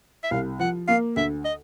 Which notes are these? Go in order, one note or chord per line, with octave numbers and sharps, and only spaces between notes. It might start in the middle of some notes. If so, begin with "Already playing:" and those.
E5
C2 F5
F3 F#5
A#3 F5
D2 E5
D#5